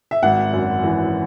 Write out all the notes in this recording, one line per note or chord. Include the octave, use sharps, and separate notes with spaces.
E5
G#1 F#5
F#2
E3